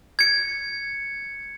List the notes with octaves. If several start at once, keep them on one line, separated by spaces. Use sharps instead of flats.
G#6 C#7